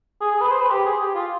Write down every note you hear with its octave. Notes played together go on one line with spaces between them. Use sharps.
G#4
G#4
B4
C5
B4
G4
G#4
G4
F4